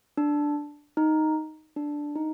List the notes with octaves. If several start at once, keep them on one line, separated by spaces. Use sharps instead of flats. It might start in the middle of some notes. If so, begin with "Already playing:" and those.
D4
D#4
D4
D#4